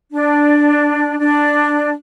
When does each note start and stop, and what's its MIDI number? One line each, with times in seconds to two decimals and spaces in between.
0.11 1.17 62
1.18 1.90 62